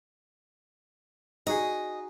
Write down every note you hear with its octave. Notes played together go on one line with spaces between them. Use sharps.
D#4 F#4 G#4 D#5